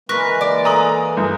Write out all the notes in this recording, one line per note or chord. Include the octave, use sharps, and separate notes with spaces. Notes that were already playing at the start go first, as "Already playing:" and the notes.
E3 G#3 A#3 A#4 B4 C#6 F#6 A#6
D5
A4 G#5 A#5 D#6
G1